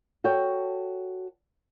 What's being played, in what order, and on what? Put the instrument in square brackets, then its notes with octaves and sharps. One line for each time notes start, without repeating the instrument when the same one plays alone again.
[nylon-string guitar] F#4 A4 C#5 G5